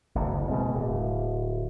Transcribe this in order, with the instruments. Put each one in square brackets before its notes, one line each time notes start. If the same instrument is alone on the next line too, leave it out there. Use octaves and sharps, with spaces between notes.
[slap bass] F#1 D2
B2 G#3 C4
D1